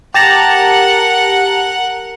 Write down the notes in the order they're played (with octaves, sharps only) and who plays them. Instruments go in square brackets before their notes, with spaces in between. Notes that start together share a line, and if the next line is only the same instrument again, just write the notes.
[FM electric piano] G4 A5 A#5 [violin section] A#4 F#5